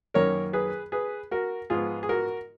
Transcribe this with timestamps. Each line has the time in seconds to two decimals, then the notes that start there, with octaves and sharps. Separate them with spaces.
0.14 F#2 D#3 A#3 C#4 A#4 C#5
0.53 G#4 B4
0.92 G#4 B4
1.31 F#4 A#4
1.70 G#2 F3 G#3 B3 F4 G#4
2.03 G#4
2.09 F#4 A#4